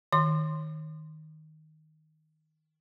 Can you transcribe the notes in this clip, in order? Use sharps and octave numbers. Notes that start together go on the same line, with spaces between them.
D#3 C6